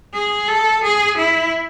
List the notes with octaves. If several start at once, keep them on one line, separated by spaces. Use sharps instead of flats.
G#4
A4
G#4
E4